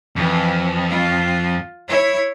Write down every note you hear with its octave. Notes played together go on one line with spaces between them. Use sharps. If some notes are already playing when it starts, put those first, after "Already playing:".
F2 E3
F4
E4 C#5